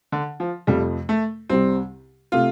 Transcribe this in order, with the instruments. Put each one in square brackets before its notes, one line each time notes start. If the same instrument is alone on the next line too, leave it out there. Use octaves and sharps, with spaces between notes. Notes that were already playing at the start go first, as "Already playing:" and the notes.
[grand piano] D3
F3
[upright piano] F2 C3 F3 A3 [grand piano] G3
[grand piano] A3
[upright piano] C2 C3 G3 [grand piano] C4
[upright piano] C3 A3 [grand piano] F4